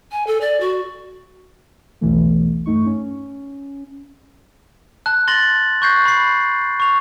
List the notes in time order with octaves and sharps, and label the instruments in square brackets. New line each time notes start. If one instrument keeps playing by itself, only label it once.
[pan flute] G#5
A4
D5
F#4
[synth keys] B1 E2 B2 E3 A3
G2 A3 D#4 C#6
C#4
[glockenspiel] A5 F#6
C6 A6 A#6 F#7
C#6 F#6 G6 A#6 C7
B5 C7
C#6 F7